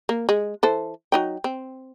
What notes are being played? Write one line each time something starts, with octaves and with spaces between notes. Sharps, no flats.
A#3
G#3
E3 A4 C5
F#3 D#4 G5
C4